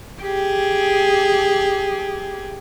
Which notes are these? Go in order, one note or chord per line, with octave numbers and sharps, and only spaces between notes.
G4 G#4